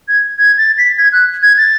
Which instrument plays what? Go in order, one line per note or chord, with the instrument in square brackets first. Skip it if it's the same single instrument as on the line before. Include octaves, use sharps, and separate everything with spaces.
[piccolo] G#6
G#6
A6
B6
G#6
F#6
G#6
A6